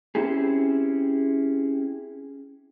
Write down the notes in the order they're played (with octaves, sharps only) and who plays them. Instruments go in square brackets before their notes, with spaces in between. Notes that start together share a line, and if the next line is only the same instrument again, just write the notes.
[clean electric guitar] C4 C#4 E4 G4 G#4